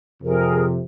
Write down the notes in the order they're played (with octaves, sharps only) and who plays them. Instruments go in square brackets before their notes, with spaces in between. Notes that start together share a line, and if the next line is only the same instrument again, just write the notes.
[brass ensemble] F2 C3 [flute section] G#4 A#4